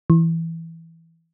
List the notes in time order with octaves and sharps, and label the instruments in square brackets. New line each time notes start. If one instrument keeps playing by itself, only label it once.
[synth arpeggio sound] E3